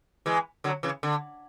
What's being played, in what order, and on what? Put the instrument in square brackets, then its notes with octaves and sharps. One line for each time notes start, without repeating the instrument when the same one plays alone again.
[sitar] E3 G#3
D3 F#3
C#3 E3
D3